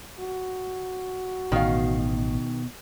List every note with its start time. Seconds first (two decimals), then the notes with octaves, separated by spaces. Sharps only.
0.20 F#4
1.52 A1 B2 D#3 F5